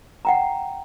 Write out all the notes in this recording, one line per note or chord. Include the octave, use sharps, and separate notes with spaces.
F#5 G5 A#5